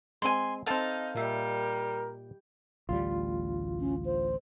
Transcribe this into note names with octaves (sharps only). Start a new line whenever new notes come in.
G#3 C4 G#5 C6
C4 D#4 A4 F5 A5
A#2 G3 A#4 E5
A1 D2 G3 F4
C#4
C5